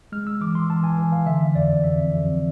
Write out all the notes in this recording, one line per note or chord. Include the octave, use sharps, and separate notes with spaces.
G#3 F6
E6
E3 D6
C6
E3 A5
G#5
E3
F5
D3 E5
F2 D5
F2 E5
F2